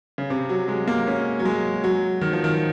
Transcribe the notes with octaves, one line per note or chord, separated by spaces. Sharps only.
C#3
C3
F#3
G#3
A#3
C#4
F#3
G#3
F#3
D#3
F3
D#3